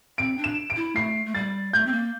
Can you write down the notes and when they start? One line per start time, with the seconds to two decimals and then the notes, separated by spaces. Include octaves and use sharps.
0.18 C4 D7
0.38 D4
0.44 E7
0.70 D7
0.76 E4
0.96 A3 C7
1.26 A3
1.35 G3 A6
1.73 A3 G6
1.86 C4
1.92 A#3